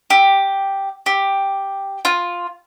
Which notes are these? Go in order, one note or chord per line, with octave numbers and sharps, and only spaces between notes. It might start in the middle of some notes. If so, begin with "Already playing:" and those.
G4
G4
F4